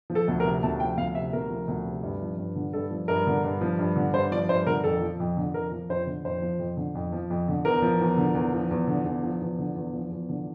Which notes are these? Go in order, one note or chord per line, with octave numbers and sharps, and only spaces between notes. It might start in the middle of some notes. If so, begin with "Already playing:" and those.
F3
A4
D2
A#4
C3
D2 A5
F3 G5
D2 F5
C3 E5
D2 A#4
F3
D2
C3
G2
F3
G2
D3
G2 A4
F3
G2 A#4
D3
G2
F3
G2
D3
G2 C5
F3 D5
G2 C5
D3 A#4
F2 A4
F3
F2
D3
F2 A#4
F3
F2 C5
D3
F2 C5
F3
F2
D3
F2
F3
F2
D3
E2 A#4
F3
E2
D3
E2
F3
E2
D3
E2
F3
E2
D3
E2
F3
E2
D3